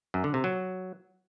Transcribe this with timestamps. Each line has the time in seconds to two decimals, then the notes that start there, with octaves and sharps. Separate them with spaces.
0.14 F#2
0.24 D3
0.34 C3
0.44 F#3